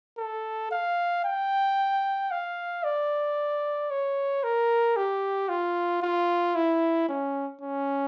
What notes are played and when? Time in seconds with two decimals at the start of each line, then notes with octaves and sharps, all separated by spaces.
0.18 A4
0.71 F5
1.25 G5
2.31 F5
2.84 D5
3.91 C#5
4.43 A#4
4.97 G4
5.49 F4
6.02 F4
6.56 E4
7.09 C#4
7.61 C#4